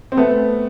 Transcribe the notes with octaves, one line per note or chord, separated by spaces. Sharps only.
C4
A3 B3